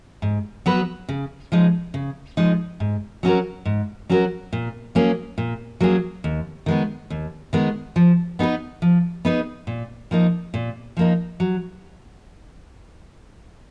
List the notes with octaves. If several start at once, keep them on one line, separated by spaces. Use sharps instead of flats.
G#2
F#3 B3 F#4 B4
C#3
F3 G#3 D#4
C#3
F3 G#3 D#4
G#2
F#3 C#4 F#4 A#4
G#2
F#3 C#4 F#4 A#4
A#2
F#3 A#3 C#4 G#4
A#2
F#3 A#3 C#4 G#4
D#2
D#3 G#3 B3
D#2
D#3 G#3 B3
F3
B3 D#4 G#4 B4
F3
B3 D#4 G#4 B4
A#2
F3 A#3 D#4
A#2
F3 A#3 D#4
F#3